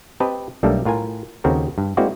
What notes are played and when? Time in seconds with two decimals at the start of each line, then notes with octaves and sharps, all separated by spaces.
0.20 C4 G4 B4 D#5 A5
0.63 B1 G3 A3 A#3 D4 A4
0.85 A2 F4 A#4 G#5
1.44 D#2 C#3 C4 F#4 A4 A#4
1.78 G2
1.97 G#3 A#3 C4 E4 F#4 D5